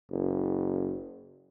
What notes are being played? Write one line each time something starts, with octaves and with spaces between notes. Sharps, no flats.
F#1